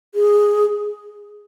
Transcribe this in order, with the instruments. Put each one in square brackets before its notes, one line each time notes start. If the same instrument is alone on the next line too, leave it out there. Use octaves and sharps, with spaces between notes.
[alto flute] G#4